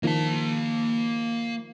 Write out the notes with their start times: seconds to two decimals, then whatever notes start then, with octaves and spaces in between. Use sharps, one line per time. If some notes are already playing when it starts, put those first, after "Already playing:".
0.03 D#3 F3 A#3 A5